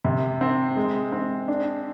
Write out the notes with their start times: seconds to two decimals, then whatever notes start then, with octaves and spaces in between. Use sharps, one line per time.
0.04 C3
0.41 C4
0.76 G#3
1.12 C4
1.48 D4